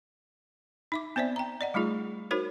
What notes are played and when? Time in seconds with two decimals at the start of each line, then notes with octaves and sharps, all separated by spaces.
0.92 D#4 E5 D6
1.16 B3 C4 C5 D5 E5
1.36 G5 A#5
1.61 D5 D#5 F#5
1.74 G3 A3 D#4 F4 G#4
2.31 D#4 F#4 A#4 C5 C#5